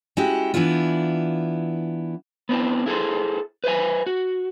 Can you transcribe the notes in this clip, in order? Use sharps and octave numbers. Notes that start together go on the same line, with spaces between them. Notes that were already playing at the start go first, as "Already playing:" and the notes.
G#3 C#4 E4 F#4 G4
E3 B3 D4 E4 F4
B3 C4 D4 E4
E4 G#4 A4 C5
B4 C5 E5 G#5
F#4